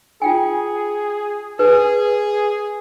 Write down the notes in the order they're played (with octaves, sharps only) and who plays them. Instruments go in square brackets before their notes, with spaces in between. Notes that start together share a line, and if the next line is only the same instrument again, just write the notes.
[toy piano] F4 G5 G#5 [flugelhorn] G#4
[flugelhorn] G#4 [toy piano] B4